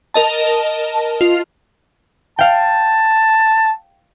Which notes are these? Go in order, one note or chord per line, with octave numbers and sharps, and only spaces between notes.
A#4 D#5 A5
F4
F5 G5 A5